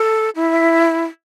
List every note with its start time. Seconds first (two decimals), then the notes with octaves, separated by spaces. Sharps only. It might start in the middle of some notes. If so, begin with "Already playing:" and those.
Already playing: A4
0.36 E4